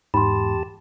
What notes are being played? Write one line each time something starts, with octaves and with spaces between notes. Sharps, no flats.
E2 G#2 G4 A5 B5 C6